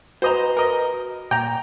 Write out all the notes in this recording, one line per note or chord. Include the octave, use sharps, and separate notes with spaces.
F#4 B4 C5 D#5 A#5
A#4 D#5
A#2 G5 A#5